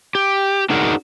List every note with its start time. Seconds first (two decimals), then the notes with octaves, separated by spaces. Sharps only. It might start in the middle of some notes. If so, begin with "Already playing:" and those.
0.15 G4
0.70 D4 D#4 F#4 G#4 A#4